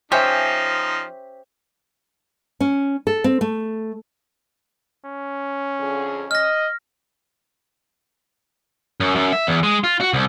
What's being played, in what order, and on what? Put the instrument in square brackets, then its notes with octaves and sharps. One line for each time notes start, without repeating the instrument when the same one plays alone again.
[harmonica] F3 D#4 [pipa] C#4 G4 [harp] C5 E5 G#5
[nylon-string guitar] C#4
A4
C4
A3
[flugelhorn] C#4
[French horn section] F2 D3 G#4
[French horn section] D#5 [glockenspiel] F6 A#6
[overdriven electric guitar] F#2
F#2
E5
E2
G#3
F4
F#4
C2